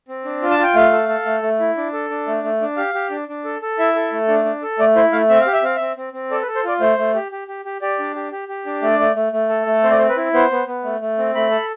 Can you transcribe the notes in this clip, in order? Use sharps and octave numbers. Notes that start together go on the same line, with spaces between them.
C4
D4
F4
A5
F4 G5
A3 F5
A4
A4
A3
A3
E4
D4
A4
D4
A3
A3
D4
G4 F5
G4
D4
D4
A4
A4
E4 E5
A4
A3
D4
D4
A4
A3 D5
E4 C5
A3 F5
C4 E5
F5
G4
E5
C4 F5
C4 E5
C4
C4
A4 D5
B4
A4
C5
F4 D5
A3 C5
A3
G4
G4
G4
G4
G4 D5
D4
G4
G4
G4
D4
A3 D5
A3
A3
A3
A4
A3
C4 C5
D5
C4 C5
B4
E4
B3 C5
B3
B3
A3
A3
C4
A3 B5
A4